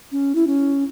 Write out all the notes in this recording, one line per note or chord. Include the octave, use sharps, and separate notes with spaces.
C#4
E4
C#4